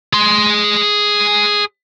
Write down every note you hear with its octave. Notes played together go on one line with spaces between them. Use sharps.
G#4 C6